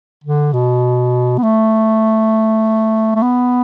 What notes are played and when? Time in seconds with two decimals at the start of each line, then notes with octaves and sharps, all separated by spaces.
0.24 D3
0.53 B2
1.38 B3
1.43 A3
3.15 A3
3.22 B3